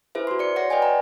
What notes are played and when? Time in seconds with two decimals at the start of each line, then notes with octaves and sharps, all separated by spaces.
0.15 E4 G#4 B4 C5 E5
0.27 F#4 C6
0.39 D5 C#7
0.56 C#5 F#5 C6 A#6
0.70 B4 D5 D#5 G5 G#5
0.82 A#5